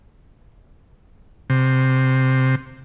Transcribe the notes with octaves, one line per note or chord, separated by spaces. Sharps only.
C3